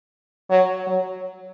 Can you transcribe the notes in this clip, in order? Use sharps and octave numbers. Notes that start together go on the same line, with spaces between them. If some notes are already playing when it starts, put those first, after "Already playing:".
F#3
F#3